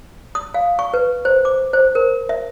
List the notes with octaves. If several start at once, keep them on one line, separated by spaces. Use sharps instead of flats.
D#6
F5
C#6
B4
C5
D6
C5
A#4
E5